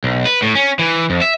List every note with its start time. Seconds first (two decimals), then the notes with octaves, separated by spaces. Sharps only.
0.04 B1
0.25 B4
0.42 A2
0.55 C#4
0.79 E3
1.10 F2
1.22 E5